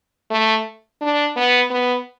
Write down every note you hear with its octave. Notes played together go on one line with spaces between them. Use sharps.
A3
D4
B3
B3